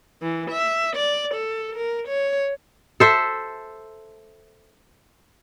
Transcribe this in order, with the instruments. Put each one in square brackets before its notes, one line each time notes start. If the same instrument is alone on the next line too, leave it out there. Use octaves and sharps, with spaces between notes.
[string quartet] E3
E5
D5
A4
A#4
C#5
[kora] A4 C5 E5